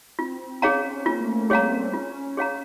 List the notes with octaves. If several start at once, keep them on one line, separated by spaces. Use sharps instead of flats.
C4 F4
C#4 G#4 C#5 F5 A#5
C#4
A#3 F4
A3
A#3
G3 G#4 C#5 F5 A#5
C4
C#4 F4
G#4 C#5 F5 A#5